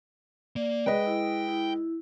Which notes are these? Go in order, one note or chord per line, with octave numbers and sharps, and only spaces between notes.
A#3 D5
G#3 B4 D#5 G5
E4
E4